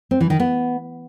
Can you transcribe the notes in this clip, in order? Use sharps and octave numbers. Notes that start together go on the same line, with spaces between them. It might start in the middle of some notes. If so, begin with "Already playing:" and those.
C4
E3
D#3
B3